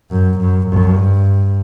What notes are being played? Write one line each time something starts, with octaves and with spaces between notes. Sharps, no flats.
F#2
F#2
F#2
G2